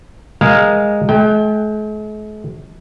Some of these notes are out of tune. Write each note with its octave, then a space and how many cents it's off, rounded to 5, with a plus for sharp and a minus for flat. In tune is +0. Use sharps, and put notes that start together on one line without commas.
G#3 -10 A#4 +0 F5 +0
G#3 +45 G5 +20